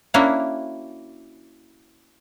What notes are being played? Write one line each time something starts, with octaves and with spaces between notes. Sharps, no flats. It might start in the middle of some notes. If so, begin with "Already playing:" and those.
A#3 C#4 D4 E4 F#4